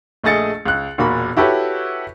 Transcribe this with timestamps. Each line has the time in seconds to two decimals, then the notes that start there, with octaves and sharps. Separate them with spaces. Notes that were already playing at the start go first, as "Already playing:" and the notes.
0.23 A#1 A3 G#4 D#5 A6 C#7
0.65 C#2 F#6
0.98 E1 A#2 A#3 F#4 B5
1.37 E4 F#4 G4 A4 B4 C#5